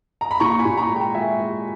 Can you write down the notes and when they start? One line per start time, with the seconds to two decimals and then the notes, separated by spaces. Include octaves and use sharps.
0.21 A#5
0.31 B5
0.40 A#2 A#5 C#6
0.50 C#6
0.59 G#5 B5
0.65 A#2
0.77 A#5 C#6
0.91 G#3
0.96 G5 A#5
1.15 G#3 E5 G#5
1.40 G#3